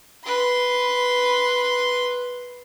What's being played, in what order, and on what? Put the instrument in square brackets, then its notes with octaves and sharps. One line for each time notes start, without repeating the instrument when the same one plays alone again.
[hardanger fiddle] B4 C6